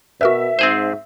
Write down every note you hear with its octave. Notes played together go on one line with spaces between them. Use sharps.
B2 F#4 A#4 B4 E5
G#2 C4 G#4 C5